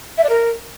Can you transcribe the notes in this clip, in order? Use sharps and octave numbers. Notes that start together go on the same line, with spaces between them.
E5
D5
A#4